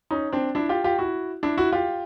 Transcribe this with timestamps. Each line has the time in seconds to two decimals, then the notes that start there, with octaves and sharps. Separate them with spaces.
0.11 C#4 D#4
0.32 C4 D4
0.55 D4 E4
0.69 F4 G4
0.84 F4 G4
0.99 E4 F#4
1.43 D4 E4
1.57 E4 F#4
1.73 F4 G4